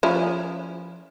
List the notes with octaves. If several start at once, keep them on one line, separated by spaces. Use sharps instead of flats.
F3 C#4 E4